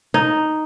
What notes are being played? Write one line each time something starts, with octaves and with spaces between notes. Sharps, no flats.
D#4